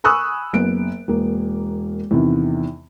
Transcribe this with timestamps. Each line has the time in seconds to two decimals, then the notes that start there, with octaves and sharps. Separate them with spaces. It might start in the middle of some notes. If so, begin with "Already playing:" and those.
0.04 G#5 B5 C#6 D#6 E6 F#6
0.53 F#1 B3 D7
1.08 E1 A#3
2.11 E2 C3 D#3